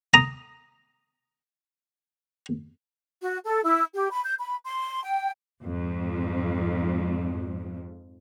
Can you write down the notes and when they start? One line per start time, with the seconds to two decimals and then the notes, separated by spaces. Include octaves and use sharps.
0.14 A#5 D#6
3.21 F#4
3.45 A4
3.64 E4
3.95 G4
4.11 B5
4.25 G6
4.39 B5
4.65 C6
5.03 G5
5.62 F2 G#2